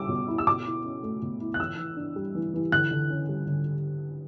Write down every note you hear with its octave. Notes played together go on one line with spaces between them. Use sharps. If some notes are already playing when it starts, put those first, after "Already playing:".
Already playing: G3 C#4 D6 E6
B2
E4
E6
B2 D6
E4
C#4
A3
B2
E4
F#6
E3 E6
E3
D4
G3
E3
E3
D3 F#6
D3
C#4
G3
D3